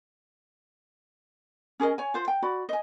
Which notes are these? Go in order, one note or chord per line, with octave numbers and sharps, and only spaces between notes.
C#4 G#4 A#4 D#5
C#5 G#5
F4 C5
G5
F#4 D5 B5
D#5 G#5